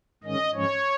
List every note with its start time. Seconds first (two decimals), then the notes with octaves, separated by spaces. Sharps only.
0.24 G#2 D#3 G#3 C#4 D#5
0.54 G#2 F3 G#3 C#4 C#5